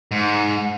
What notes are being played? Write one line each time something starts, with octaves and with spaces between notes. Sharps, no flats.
G#2